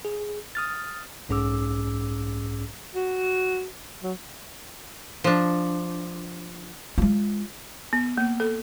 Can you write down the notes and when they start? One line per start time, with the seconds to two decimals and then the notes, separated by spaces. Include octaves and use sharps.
0.05 G#4
0.55 D#6 F6 A6
1.29 B1 G#2 C#4 G#4 D6 E6
2.95 F#4
4.03 F#3
5.24 F3 D4
6.98 G#3 F4
7.93 B3
8.17 A#3
8.40 A4